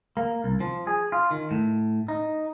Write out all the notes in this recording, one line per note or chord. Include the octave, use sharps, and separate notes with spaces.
A#3
C2
F3
G#4
F4
D#3
A2
D#4